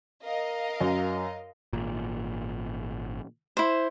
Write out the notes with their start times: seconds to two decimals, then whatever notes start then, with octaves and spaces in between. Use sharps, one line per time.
0.24 A#4 D#5 F5
0.81 F#2
1.73 G#1 A#2
3.57 E4 C5